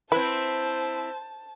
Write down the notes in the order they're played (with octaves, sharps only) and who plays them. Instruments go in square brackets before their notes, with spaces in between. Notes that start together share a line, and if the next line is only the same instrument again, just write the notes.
[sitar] C4 E4 [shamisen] B4 [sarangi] C5 [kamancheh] A5